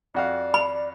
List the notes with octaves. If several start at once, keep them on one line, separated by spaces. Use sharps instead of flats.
F2 F#4 D5 F5
B5